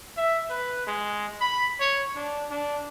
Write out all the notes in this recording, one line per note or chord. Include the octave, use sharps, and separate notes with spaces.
E5
B4
G#3
B5
C#5
D4
D4